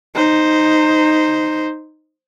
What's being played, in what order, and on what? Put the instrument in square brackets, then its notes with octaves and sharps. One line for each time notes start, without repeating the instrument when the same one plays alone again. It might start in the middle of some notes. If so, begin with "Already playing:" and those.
[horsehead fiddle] D#4 C5